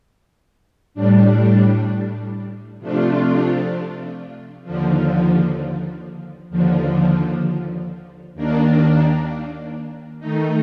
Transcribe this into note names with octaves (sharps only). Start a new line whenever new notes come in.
A2 G3 D4
C3 F3 A3 D4 F4
D#2 D3 F3
D#2 D3 F3
D#2 D#3 A#3 D4
D#3 A3 D#4